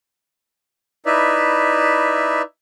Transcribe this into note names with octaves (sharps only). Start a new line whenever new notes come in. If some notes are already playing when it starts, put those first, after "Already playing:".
D#4 E4 B4 D5 E5